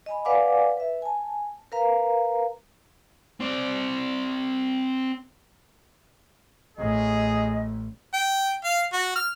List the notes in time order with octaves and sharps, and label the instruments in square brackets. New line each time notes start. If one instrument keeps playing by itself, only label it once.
[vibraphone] D#5 G#5 B5
B4 D5 F5 F#5 G#5 D6
B4 E5
G#5 A5
A#4 B4 F5 A#5
[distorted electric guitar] C4 D5
[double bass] A1 A2 [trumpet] G#4 [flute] D#5
[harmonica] G5
F5
F#4
F6